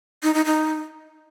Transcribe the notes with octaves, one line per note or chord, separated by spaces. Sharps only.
D#4
D#4
D#4